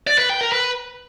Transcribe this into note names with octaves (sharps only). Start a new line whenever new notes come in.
D5
B4
G5
A#4
B4